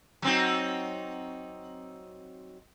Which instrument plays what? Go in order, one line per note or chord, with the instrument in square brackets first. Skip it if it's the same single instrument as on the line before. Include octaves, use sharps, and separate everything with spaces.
[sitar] F#3 C4 D#4